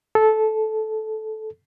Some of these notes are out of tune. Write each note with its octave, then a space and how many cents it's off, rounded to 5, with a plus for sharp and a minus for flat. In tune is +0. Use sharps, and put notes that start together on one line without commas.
A4 -15